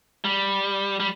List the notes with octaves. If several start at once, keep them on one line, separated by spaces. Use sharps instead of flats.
G3
G3